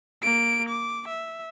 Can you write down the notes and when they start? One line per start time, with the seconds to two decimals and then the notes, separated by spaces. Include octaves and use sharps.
0.23 A#3 D7
0.69 D6
1.08 E5